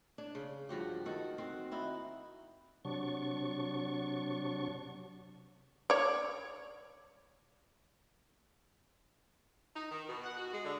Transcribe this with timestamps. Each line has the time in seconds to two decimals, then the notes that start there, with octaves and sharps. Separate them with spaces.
0.18 D4
0.35 C#3
0.69 G2 F3 F#4 G4
1.05 D#3 F#4 A4
1.38 C4 F#4
1.71 D#4 E4 F#4
2.85 C3 F#3 D4 C#6
5.90 C#5 D5
9.75 D#4
9.91 D#3
10.09 B2
10.24 F#5
10.37 F#4
10.53 G#3
10.64 D3